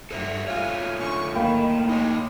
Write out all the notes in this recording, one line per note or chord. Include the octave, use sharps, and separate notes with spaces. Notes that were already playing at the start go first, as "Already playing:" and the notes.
G2 A4 C5 E5
A3 F4 C#5 F5 G#5
D3 C#4 C#6
C2 A2 D#3 A#3 G5 B5
G#3 D#4 C#5